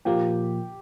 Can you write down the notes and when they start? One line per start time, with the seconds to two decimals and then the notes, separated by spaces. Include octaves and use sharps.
0.05 A#2 F3 A#3 G4